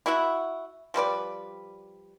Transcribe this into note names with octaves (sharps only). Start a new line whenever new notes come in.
E4 F#4 E5 F#5
F3 G3 B4 D5